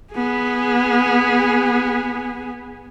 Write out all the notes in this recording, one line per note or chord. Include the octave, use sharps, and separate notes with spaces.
B3 G#4